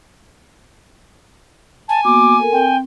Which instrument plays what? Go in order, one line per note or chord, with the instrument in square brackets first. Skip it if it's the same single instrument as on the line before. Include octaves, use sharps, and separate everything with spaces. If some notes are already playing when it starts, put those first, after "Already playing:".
[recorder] G#5 [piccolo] A5
[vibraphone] A#3 B3 F#4 [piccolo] D6
[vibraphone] A4 A#4
[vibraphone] C4 [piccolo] G5